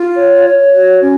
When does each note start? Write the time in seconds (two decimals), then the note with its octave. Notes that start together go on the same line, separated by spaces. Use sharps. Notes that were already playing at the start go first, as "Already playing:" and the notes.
Already playing: F4
0.18 C#5
0.46 C#5
0.74 F#4
1.02 C#4